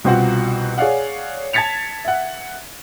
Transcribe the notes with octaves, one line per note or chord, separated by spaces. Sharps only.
C2 B2 C4 F4 F#4 F#5
G#4 C#5 D5 F5 F#5
A5 G#6 A6 B6 C#7 F7
E5 F#5